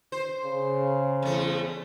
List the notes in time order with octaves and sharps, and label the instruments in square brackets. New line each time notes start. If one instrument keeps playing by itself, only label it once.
[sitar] C5
[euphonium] C#3
[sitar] E2 A3